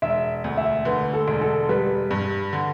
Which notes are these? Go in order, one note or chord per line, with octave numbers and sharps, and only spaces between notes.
E1 E5
D2
E5
D3 B4
A4
E1
A4
G3 B4
G2
D3